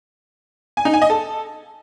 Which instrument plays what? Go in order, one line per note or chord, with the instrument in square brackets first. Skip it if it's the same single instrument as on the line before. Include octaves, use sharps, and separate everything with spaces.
[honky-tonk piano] G#5
D#4
G#5
D#5
A4